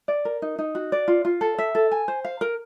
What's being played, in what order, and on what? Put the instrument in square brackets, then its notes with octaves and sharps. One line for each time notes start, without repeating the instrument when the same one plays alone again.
[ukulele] D5
A#4
D#4
D#4
F#4
D5
F4
F4
A4
E5
A4
G#5
C5
F5
A#4